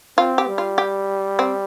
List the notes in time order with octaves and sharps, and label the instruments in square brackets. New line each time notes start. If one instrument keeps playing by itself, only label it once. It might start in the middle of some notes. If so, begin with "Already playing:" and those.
[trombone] C4 [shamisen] F4
[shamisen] G4
[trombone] G3
[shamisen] F4
G4
C4